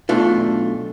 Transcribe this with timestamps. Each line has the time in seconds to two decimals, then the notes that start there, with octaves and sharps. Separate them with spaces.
0.09 B1 A3 D4 F4